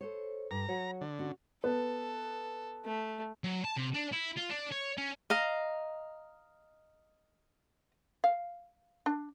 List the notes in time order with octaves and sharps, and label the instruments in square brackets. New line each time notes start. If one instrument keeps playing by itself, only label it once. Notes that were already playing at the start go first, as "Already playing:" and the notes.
[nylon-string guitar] A4 C5 C#5
[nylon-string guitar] G2 [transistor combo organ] A#5
[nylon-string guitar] F#3 F#4 C#5
[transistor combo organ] D3
[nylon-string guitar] C#4 F#4
[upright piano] B3 [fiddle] A4
[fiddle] A3
[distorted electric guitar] F#3
A5
C3
D4
E4
F4
D4
C#5
C#4
[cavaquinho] D#5 F5 A#5
[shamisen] F5
D4